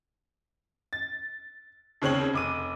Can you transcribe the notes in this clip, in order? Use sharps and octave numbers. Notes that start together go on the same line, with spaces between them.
A6
D#2 C#3 C4 C#5 F#7
F1 D6 D#7